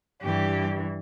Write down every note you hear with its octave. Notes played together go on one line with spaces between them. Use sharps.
G2 E3 G4